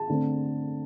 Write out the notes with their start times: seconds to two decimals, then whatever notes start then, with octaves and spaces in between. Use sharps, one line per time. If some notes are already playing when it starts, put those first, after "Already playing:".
Already playing: A5
0.09 D3 A3 C4